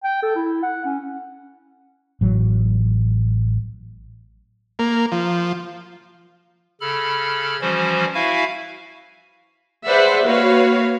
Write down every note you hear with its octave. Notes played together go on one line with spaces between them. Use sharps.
G5
A4
E4
F#5
C#4
A1 F#3
A#3
F3
C#3 A4 B5 F6
E3 F3 G3 C#4 F#4 C5
E4 F#4 E5 F5 G#5
G#4 B4 C5 D5 E5 F#5
A#3 F#4 B4 C#5 F5